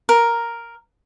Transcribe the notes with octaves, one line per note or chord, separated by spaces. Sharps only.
A#4